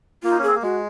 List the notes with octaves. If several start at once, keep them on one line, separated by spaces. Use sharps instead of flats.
A#3 F4
D#4
C#4
C4 G#4
A#3
G#3 F#4